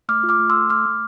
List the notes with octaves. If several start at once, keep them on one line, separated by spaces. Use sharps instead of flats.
A3 D6 F6
F4
D6 F6
A3
C6 E6
A4
A3 D6 F6
A3